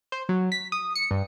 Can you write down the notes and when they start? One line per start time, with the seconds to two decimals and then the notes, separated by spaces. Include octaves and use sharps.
0.12 C5
0.29 F#3
0.52 B6
0.72 D#6
0.96 C#7
1.11 G2